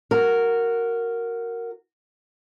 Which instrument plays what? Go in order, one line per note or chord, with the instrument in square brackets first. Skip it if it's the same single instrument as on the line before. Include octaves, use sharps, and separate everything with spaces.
[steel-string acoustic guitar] F#4 A#4